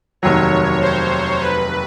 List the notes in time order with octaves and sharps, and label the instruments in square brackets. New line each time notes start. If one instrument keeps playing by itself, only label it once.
[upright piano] F1 D#2 D#3 F#3 [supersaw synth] C#5
[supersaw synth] C5
B4